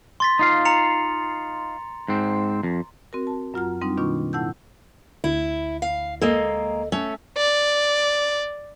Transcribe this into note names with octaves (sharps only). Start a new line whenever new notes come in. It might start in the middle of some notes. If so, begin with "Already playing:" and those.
C6 A6 B6
D#4 F4 F5
A#5 C#7 F7
G#2 C4
F2
C4 F#4 A#4
A5
F#2 F#3 F4 F#5 A#5 F6
G3 C4 D4 D#4
B2 D#3 A#3 D4 F4 C#6
A2 E4 F#5 A5 E6 G6
D2 E4
F5
G#3 A#3 A4 D#5
A3 C#4
D5